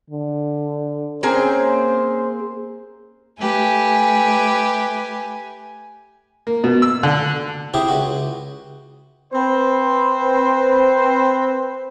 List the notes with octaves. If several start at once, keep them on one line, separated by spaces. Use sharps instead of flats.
D3
A#3 C4 C#4 G#4 C5
A3 G4 B4 G#5
A#3
B2
E6
D3
C4 E4 G4 G#4
C#2 F#4
C4 B4 C5